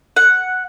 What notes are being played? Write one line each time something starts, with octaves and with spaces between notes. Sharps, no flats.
F#5